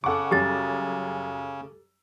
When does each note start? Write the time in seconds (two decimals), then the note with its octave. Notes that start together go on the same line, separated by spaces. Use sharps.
0.04 C#3 A4 F#5 C#6 D6
0.31 F#2 G3 C#4 G4 A6